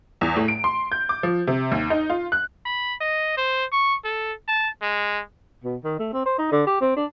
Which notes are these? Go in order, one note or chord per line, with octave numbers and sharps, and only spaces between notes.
E2
A2
D7
C6
G6
D6
F3
C3
D#2
D#4
F4
F#6
B5
D#5
C5
C#6
A4
A5
G#3
B2
D#3
A3
C4
C5
D#4
D3
G4
C4
D4